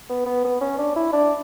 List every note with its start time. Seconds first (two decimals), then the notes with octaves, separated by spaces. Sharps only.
0.09 B3
0.26 B3
0.44 B3
0.61 C#4
0.78 D4
0.96 E4
1.13 D4